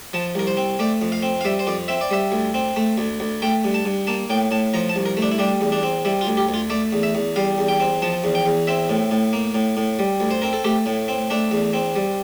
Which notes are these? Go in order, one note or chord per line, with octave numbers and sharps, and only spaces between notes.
F3 A5
C2 A#4
C5
C4
A3 D5
F2
F5
C4
F5
G3 E5
C5
F2 D5
C4 E5
D5
G3 E5
D2
C4
A3
D2
D2
A3 G5
G2
A5
G2
A#3 A5
A2 G5
A2 A5
F3 A#5
A5
C2
A#4
A3
D4
E4
G3 D4
E2
D4
C4
G3 E4
F4
D2
G4
D2
F4
A3 D5
E2
E5
E2
G3 F5
E2
G5
C4
F3 A5
E2
G5
E2
C4 E5
A2
A2
A#3
A2
A2
G3
D2
C5
C4 A#4
A4
A3 G4
A2
C4
A3 D4
E2
C4
G3